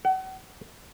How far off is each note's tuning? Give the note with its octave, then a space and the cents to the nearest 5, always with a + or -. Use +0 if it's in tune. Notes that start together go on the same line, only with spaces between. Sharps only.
F#5 +35